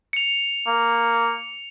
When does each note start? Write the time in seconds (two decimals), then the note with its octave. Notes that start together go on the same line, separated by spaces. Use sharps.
0.13 C#7 F7
0.68 A#3